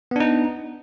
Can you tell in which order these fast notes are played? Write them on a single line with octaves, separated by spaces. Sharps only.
B3 D4 D#4